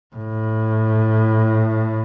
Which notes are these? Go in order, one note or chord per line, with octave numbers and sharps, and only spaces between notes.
A2